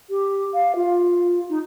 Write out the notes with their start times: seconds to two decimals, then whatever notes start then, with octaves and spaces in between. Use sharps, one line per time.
0.10 G4
0.54 F5
0.75 F4
1.50 D#4